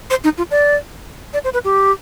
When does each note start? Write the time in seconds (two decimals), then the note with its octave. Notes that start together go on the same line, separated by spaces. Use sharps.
0.10 C5
0.24 D#4
0.38 F4
0.51 D5
1.33 D5
1.44 C5
1.53 B4
1.64 G4